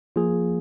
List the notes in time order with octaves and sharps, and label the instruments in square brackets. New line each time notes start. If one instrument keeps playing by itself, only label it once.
[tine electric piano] F3 A#3 F4 G#4